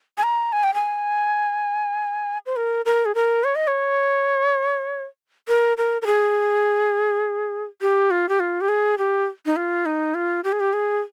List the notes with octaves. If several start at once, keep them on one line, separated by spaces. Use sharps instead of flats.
G#5
A#5
G#5
G5
G#5
C5
A#4
A#4
G#4
A#4
C#5
D#5
C#5
A#4
A#4
A#4
G#4
G4
F4
G4
F4
G4
G#4
G4
D#4
F4
D#4
F4
G4
G#4
G4
G#4